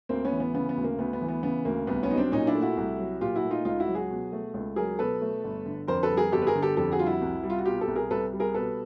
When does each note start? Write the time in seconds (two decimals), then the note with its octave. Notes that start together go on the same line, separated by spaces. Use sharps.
0.09 D2 A#3 C4
0.25 B3 C#4
0.33 E3
0.40 B3
0.54 C#3 B3
0.69 B3
0.77 D2
0.84 A#3
0.99 D2 B3
1.13 B3
1.21 E3
1.28 B3
1.43 C#3 B3
1.65 D2 A#3
1.87 C2 B3
2.03 B3 C#4
2.10 F#3 D#4
2.17 C4 D4
2.32 A#2 C#4 D#4
2.47 D4 E4
2.55 A3
2.61 E4 F#4
2.77 C2
2.99 F#3
3.21 A#2 F4 G4
3.36 E4 F#4
3.44 A3
3.51 D#4 F4
3.65 C#2 D#4 F4
3.80 E4 F#4
3.88 F#3
3.95 F#4 G#4
4.10 B2
4.32 A3
4.54 C#2
4.76 F#3 G#4 A#4
4.99 B2 A4 B4
5.22 A3
5.44 G1
5.66 D3
5.88 F2 A#4 C5
6.03 A4 B4
6.10 G3
6.17 G#4 A#4
6.32 G1 G4 A4
6.42 B4
6.47 G#4 A#4
6.55 D3
6.62 G4 A4
6.76 F2 G4 A4
6.92 F#4 G#4
6.99 G3 F4
7.06 E4 F#4
7.22 C2
7.43 G3
7.50 F4
7.58 F#4
7.65 B2 F4 G4
7.81 G4 A4
7.88 C2
7.95 G#4 A#4
8.11 C2 A4 B4
8.33 G3
8.40 G#4 A#4
8.54 B2 A4 B4